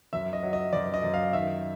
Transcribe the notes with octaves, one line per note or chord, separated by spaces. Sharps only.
F#2 E5
D#5
F#3
D#5
F#2 D5
D#5
F#2
F5
D#3 E5